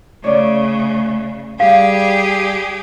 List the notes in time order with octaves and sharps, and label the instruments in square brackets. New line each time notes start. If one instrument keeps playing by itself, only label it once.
[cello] C#3 [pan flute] A3 [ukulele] C#5 D5
[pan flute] G3 [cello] G4 G#4 [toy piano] F5